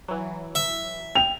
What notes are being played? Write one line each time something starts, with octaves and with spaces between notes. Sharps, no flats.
E3 F#3
E5
G5 F7